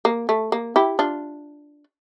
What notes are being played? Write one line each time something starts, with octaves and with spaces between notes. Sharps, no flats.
A#3
A3
A#3
E4 G4
D4 F4